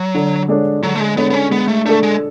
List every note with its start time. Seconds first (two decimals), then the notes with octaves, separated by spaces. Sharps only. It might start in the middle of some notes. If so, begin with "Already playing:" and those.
Already playing: F#3
0.15 D3
0.48 G#3 D4 A4 C#5
0.82 D3 F#3
0.95 A3
1.00 G#3
1.17 G#3 B3 D4 A4 C#5
1.30 B3
1.34 C#4
1.51 G#3 B3
1.68 A3
1.85 A3 D4 A4
2.03 G#3